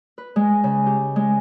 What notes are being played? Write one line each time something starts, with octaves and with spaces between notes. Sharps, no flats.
B4
G#3
C#3
G4
G#3